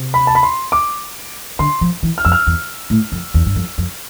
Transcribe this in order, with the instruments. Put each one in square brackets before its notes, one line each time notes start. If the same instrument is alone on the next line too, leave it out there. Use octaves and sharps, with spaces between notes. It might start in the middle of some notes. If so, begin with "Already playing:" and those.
Already playing: [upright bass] C3
[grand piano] B5
A5
B5
C6
D6
[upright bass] D3 [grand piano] C6
[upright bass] F3
E3
[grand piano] F6
[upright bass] F2 [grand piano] E6
[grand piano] F6
[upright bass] E2
A2
F2
E2
G2
F2
F2